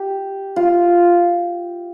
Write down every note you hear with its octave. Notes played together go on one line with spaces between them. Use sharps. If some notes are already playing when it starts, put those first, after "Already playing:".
Already playing: G4
F4